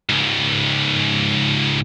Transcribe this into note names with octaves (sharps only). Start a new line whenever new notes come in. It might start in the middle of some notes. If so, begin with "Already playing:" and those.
C#2 G#2